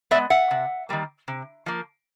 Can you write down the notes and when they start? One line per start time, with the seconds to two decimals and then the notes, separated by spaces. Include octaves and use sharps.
0.11 B3 D5 E5
0.15 G#3
0.30 E5 F#5
0.51 C3
0.89 D#3 G3 A#3
1.28 C3
1.66 F3 A#3